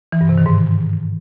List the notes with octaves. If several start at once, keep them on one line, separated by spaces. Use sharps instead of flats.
E3
G2
C3
D#3
G#2